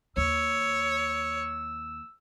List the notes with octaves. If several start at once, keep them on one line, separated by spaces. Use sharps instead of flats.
D#2 C#5 E6